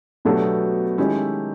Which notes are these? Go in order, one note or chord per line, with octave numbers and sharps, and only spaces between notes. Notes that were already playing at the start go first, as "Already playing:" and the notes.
B2 F#3 A3 B3 D4 G4 A4
D#3 G#3 C#4 E4 G4